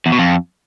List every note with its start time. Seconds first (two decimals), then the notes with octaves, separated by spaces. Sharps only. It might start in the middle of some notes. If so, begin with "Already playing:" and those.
0.06 E2
0.12 B2
0.19 F2